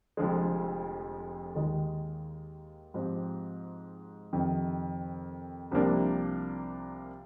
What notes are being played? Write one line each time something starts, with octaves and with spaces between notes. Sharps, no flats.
F1 F2 D3 F3 G#3
D#2 D#3 G#3 D#4
G#2 F3 C4 G4
F2 C3 D#3
C2 C3 F3 A#3 D4